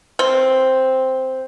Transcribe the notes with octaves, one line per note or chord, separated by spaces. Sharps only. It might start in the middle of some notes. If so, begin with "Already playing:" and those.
C4